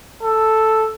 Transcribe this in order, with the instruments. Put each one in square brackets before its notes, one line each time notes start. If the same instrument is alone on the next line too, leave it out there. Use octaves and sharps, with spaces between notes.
[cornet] A4